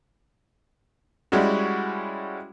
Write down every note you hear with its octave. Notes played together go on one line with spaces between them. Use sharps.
G3 G#3 C#4 E4 F#4